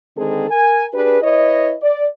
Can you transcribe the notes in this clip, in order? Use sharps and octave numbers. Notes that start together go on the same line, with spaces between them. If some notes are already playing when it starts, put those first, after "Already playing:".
D3 D#3 G#3 C4 G#4 A4
A#4 G#5
D4 G4 G#4 B4
E4 B4 C#5 D#5
D5